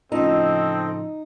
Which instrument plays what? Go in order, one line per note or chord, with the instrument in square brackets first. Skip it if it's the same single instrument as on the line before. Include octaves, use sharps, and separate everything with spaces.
[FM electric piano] A2 C#3 F3 [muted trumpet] C4 [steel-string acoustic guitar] D#4 [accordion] A4 D#5